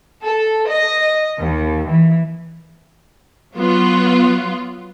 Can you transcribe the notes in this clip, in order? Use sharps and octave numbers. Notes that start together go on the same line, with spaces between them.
A4
D#5
D#2
E3
F#3 B3 F4